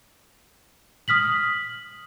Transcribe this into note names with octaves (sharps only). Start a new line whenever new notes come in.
D#6 F6 B6 F#7